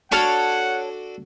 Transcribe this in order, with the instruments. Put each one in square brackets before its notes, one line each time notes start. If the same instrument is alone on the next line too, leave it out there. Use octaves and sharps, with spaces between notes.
[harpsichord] D4 F#4 A4 [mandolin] C#5 A5 F6 [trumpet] F#5